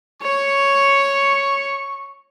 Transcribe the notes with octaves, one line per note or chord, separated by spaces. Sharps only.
C#5 C#6